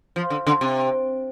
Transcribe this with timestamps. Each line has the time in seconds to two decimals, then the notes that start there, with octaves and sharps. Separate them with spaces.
0.16 F3
0.30 D3
0.47 D3
0.61 C3